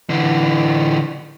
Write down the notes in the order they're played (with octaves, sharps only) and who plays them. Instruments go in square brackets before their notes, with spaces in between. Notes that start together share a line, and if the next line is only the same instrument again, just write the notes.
[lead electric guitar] D3 E3